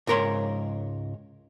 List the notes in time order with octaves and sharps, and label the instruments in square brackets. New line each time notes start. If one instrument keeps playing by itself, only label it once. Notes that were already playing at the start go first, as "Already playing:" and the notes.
[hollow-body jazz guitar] C#2 G#2 A#4 C#5 C6